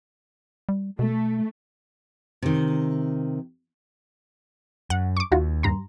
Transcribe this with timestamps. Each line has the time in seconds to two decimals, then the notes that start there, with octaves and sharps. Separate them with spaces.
0.69 G3
0.99 B2 A3
2.42 C3 D#3
4.90 F#2 F#5
5.17 C#6 D6
5.32 D#2 D#4 F4 F#4
5.63 G2 A#5 C6